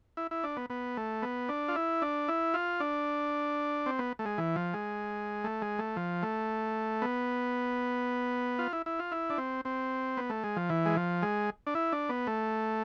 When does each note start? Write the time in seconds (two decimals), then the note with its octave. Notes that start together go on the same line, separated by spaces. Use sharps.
0.17 E4
0.31 E4
0.44 D4
0.57 B3
0.70 B3
0.97 A3
1.22 B3
1.49 D4
1.68 F4
1.76 E4
2.02 D4
2.28 E4
2.54 F4
2.80 D4
3.86 C4
3.99 B3
4.19 A3
4.26 G#3
4.38 E3
4.56 F3
4.74 G#3
5.44 A3
5.62 G#3
5.79 A3
5.96 F3
6.23 A3
7.02 B3
8.59 F4
8.73 E4
8.86 E4
8.99 F4
9.12 E4
9.30 D4
9.38 C4
9.65 C4
10.17 B3
10.30 A3
10.44 G#3
10.56 F3
10.69 E3
10.85 G#3
10.97 F3
11.22 G#3
11.67 D4
11.75 E4
11.92 D4
12.09 B3
12.27 A3